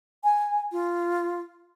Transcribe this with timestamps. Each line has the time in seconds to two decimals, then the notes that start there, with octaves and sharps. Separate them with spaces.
0.24 G#5
0.72 F4